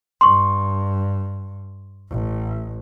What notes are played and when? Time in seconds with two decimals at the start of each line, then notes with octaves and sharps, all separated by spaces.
0.21 G2 C6 C#6
2.10 A1